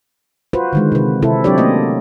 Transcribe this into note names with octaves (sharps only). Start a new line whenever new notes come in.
F4 F#4 B4 C5
D3 D#3 G#3
C3 B4
C3 C4 E4 A4
F#3 C4 D4 G4 C#5 D5
A3 A#3 C#4 D#5